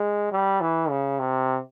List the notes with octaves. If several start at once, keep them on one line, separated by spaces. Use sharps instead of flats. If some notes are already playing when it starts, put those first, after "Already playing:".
Already playing: G#3
G3
E3
C#3
C3